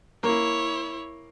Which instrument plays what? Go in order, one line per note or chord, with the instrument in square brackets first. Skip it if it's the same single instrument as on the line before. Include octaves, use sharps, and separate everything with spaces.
[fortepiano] A#3 [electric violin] E4 C#5